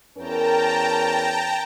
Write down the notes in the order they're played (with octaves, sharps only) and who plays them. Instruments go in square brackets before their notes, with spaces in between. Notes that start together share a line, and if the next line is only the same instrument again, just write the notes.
[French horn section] E2 C#4 A#4 [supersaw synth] G5 A5 A#5